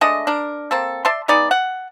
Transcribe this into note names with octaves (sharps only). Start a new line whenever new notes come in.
G#3 A3 D4 D#5
D4 A#4
A#3 C4 A4
D5 E5 A5 C6
G#3 B3 D#4 D5
F#5